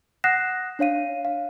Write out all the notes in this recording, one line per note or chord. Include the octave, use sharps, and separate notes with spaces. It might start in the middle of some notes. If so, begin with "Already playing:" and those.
F#5 D#6 F#6 A#6 C7 E7
D4 C#5 F5 D#7
F5